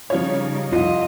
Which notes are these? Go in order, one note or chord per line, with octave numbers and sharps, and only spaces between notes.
C#3 F3 G3 D#4 F4 C#5
C2 F2 F4 D#5